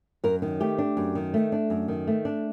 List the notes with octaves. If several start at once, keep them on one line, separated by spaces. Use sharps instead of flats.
F#2 A#4
D#3
A3 G4
D4
F#2
D#3
A3
D4
F#2
D#3
A3
D4